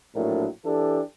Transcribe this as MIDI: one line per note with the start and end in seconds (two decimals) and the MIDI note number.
0.14 0.47 34
0.14 0.47 45
0.14 0.47 54
0.14 0.47 62
0.14 0.47 70
0.65 1.01 52
0.65 1.01 62
0.65 1.01 67
0.65 1.01 69